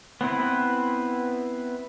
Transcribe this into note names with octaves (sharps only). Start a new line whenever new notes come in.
B3 C4 E4 B4